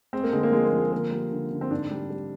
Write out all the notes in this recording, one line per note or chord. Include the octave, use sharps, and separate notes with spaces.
G#3 C4
A#3
D3 G#3
A#3
F3 G#3
A#3
F3
G#3
D3 A#3
G3
D3
D3
C4
G#2 D4
G3
G3